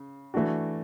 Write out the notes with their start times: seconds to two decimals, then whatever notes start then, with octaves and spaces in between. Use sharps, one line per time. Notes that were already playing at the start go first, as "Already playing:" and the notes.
Already playing: C#3
0.34 E3 A3 D4 F#4